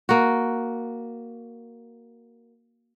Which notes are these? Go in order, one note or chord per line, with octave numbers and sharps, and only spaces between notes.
A#3 F#4